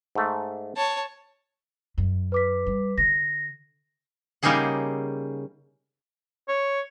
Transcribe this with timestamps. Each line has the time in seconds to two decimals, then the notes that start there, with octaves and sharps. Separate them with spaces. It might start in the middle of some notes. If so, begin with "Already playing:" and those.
0.15 G#2 A3
0.77 C#5 A5
1.98 F#2
2.32 B4 D6 B6
2.66 G3
2.98 D3 A#6
4.43 C#3 G3 A#3 D#4 G#4 F#5
6.48 C#5